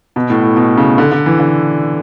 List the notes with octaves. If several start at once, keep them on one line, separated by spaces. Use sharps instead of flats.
B2
A2
A2
B2
C#3
D3
D3
E3
D3